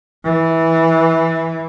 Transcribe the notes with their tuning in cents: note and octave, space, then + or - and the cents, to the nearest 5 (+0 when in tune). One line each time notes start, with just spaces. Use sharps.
E3 -10